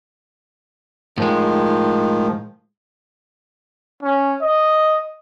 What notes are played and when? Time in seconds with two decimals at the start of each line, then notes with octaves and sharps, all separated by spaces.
1.18 A2 D#3 F3 G#3
4.03 C#4
4.42 D#5